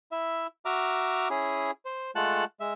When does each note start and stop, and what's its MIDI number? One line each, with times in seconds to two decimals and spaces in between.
0.12 0.47 64
0.12 0.47 76
0.65 1.28 66
0.65 1.28 76
0.65 1.28 82
0.65 1.28 86
0.65 1.28 89
1.30 1.71 61
1.30 1.71 64
1.30 1.71 68
1.85 2.11 72
2.16 2.44 56
2.16 2.44 57
2.16 2.44 65
2.16 2.44 78
2.16 2.44 81
2.16 2.44 90
2.60 2.74 56
2.60 2.74 76